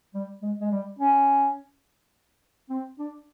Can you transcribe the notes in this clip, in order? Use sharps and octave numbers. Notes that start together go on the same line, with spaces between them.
G3
G#3
G#3
G3
C#4
C4
D4